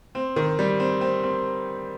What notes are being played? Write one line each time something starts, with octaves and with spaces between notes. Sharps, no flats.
C4
D#3
G3
C4
C4
C4